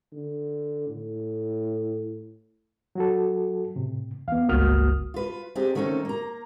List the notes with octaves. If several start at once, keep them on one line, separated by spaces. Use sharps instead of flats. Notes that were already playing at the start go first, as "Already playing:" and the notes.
D3
A2
F#3 F#4 A4
A2 C3
E2 B3 F5
G1 C#2 A#3 F#4 D#6 F6
F4 B4
C4 D4 D#4 G4 G#4
D#3 A3 C4 C#4 D#4 A4
A#3 A#5